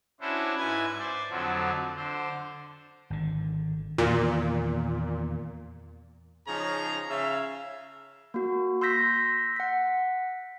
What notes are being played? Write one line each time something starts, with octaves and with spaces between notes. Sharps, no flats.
C#4 D4 E4 F#4 C5
G#2 E4 B4 G#5 G#6
C5 D5
F2 D3 F3 F#3
D3 C5
G#1 D3
E2 A#2 D#3
C#3 F3 C#4 D#4 G#4 A#5
C#3 E5 F5
A#3 F#4
C6 E6 G6 A#6 B6
F#5 B6